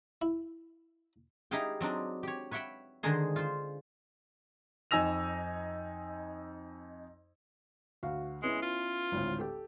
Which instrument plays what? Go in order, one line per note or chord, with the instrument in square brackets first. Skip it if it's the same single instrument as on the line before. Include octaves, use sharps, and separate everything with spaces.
[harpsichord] E4
[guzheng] D#4 E4 G4 G#4 F5 G5
F#3 C4 D4 D#4
G4 C#5
B4 C#5 E5 F#5 G5 B5
D3 D#3 G#3 D#4 G#4 C5
F4 C5
[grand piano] F2 D#4 G#5 E6 A#6 F7
[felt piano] D2 F#4 F5
[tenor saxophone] G#3 [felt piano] B3 C#4 E4
[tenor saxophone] F4
[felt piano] G#1 D2 A2
G4 A4